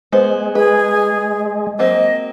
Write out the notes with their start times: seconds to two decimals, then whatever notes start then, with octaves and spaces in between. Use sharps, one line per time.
0.13 G#3 B3 C5
0.55 G#4 B4
1.79 F#3 A#3 C4 D#5